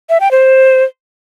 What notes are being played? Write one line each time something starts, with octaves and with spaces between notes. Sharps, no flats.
E5
G5
C5